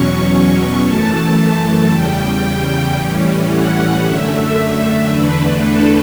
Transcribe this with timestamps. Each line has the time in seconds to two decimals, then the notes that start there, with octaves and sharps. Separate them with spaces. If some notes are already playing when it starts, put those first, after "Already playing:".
Already playing: E2 B2 F#3 C#4 C#6
0.30 C#6
0.84 F#2 E3 A3 A5
1.90 E2 C#3 G3 G5
2.97 A2 E3 G3 C#4
3.50 F#5
4.03 F#2 D3 A3 E5
5.10 E2 D3 A3 D4 B4
5.62 A4